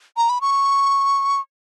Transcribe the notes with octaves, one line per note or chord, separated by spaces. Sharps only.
A#5
B5
C#6